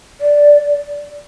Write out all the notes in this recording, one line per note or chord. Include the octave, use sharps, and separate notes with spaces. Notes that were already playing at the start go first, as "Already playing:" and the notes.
D5